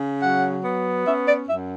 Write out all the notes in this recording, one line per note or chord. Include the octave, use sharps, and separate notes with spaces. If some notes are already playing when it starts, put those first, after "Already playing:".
Already playing: C#3
F#3 F#5
B3
C#4 E5
D5
F#2 E5